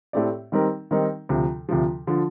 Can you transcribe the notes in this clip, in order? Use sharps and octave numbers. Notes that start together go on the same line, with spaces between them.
A2 A3 C4 G4 D5
D#3 G3 C4 D#4 A#4
D#3 G3 C4 D#4 A#4
D2 C3 F3
D2 C3 F3
D3 F3